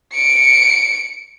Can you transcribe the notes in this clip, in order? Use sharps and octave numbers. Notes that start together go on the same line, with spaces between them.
C#7 D7